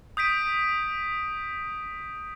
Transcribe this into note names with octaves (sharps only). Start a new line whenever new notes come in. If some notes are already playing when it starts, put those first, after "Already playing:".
D#6 G6 B6 D7 D#7